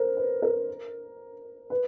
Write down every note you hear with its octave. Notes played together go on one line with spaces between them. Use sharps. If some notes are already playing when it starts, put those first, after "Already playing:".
Already playing: A#4 C5
B4
A#4
B4